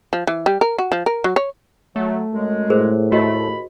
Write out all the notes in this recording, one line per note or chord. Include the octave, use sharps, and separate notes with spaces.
F3
E3
G3
A#4
F#4
F3
A#4
F#3
C#5
F#3 A3
F#2 G#3
A2 G#4 A#4 C5
D#2 A3 F#4 D#5 B5